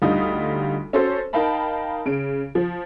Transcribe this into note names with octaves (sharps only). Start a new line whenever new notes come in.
D2 D3 G3 D#4 F4 D#6
C#4 F#4 A4 C5
D#4 A#4 F5 G5 A5 B5
C#3 D7
F3